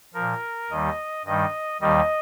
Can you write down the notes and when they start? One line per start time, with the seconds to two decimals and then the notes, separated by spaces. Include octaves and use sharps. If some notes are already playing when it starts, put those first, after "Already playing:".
0.14 A#2 F3 A#4
0.70 D#2 D#3 G3 D#5
1.25 G2 D#3 G3 D#5
1.81 D#2 D#3 G3 D#5